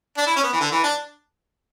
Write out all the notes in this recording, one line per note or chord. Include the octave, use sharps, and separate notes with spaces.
D4
E4
C#4
B3
E3
D3
E3
D4